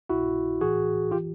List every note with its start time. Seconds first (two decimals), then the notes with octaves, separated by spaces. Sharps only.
0.09 C2 B2 E4 F#4
0.61 A#1 A2 E3 F#4 G#4
1.11 E3 F4 G4